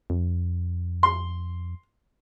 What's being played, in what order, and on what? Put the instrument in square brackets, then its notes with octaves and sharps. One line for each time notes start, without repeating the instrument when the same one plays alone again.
[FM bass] F2
[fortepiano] C6